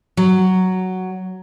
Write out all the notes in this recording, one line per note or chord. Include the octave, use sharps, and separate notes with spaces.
F#3